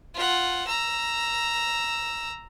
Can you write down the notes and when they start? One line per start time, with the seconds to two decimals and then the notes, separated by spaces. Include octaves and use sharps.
0.15 F4 F#5
0.67 A#5 E6